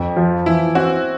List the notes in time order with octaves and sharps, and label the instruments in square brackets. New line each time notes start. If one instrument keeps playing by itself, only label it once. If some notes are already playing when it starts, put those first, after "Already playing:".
Already playing: [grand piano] F2
F3
[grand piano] E3 [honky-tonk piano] E4
[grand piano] C4 [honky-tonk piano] F#4